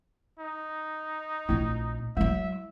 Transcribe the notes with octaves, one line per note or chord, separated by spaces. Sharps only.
D#4
A#1 A3 C4 E4
F#3 G#3 E4 E5